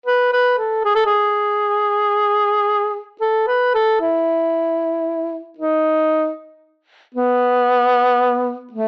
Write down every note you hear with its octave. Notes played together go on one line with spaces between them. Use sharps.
B4
B4
A4
G#4
A4
G#4
A4
B4
A4
E4
D#4
B3
A3